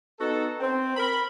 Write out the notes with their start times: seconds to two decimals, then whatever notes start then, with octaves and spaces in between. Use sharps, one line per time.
0.19 B3 D#4 F#4 A4
0.60 C4
0.97 A#4 B5